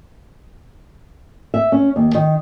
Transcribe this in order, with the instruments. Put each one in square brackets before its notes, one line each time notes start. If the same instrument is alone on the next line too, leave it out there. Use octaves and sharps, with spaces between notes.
[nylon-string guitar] E5
C#4
D#2
D#3